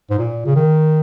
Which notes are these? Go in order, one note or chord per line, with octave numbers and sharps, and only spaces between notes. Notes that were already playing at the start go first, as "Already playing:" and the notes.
G#2
A#2
C#3
D#3